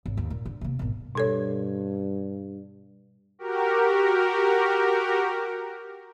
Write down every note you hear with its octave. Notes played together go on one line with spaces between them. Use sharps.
G#1
D#2
A#2
D3
C3 A#3
G#1 B2
G2 B2 A4 C#5
F#4 G4 A#4